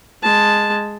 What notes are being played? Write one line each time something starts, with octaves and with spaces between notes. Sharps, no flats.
G#3 A5